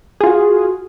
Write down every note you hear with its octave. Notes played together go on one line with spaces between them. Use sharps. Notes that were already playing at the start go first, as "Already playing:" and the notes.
F4 F#4 G#4